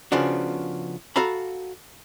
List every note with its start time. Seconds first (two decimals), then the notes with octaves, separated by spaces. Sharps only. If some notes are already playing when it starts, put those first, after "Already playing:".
0.12 C#3 F3 B3 D4 F#4
1.16 F#4 A4 F5 A#5 B5